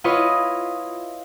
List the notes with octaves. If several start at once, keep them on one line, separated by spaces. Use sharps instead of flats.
E4 F4 B4 C#5 D#5